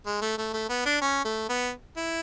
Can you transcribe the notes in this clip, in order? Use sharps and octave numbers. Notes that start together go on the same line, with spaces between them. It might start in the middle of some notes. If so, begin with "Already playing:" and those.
G#3
A3
A3
A3
B3
D4
C#4
A3
B3
E4